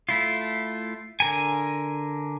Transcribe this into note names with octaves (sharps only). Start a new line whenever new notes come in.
A3 E4 F4
D3 A#4 G#5